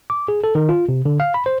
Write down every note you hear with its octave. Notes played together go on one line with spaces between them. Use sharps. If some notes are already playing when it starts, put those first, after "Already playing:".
D6
G#4
A4
D#3
F4
C3
D3
F5
B5
C5